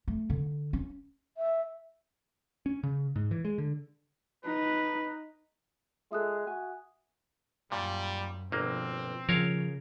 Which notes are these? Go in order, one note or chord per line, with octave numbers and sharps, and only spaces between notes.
A3
D3
C#4
E5
C#4
C#3
G#2
E3
G#3
D3
D#4 B4
G#3 F4 A4 E5 D#6 F#6
F#4 G#5
F#2 A#2 G3
G1 B2 F3 A#3 C4
C#3 F3 A#4 C#5 F5